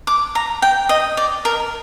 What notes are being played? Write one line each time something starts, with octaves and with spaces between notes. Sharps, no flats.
D6
A#5
G5
D#5
D5
A#4